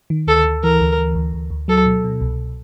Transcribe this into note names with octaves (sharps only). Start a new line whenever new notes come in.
D#3
D2 A4
D2
E3 A#4
D2
E3
D2
D2
D2
F#3 A4
B2
B2
C2